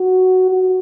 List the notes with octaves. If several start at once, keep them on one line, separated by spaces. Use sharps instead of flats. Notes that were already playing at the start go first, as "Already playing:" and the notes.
Already playing: F#4
F#4